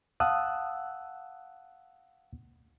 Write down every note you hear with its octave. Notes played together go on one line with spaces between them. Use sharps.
F5 F#5 A5 D#6 E6 F#6